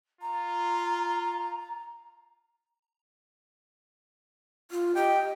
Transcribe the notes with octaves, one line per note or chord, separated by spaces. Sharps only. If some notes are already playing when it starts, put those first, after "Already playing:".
F4 A#5
F4
G4 D#5 G5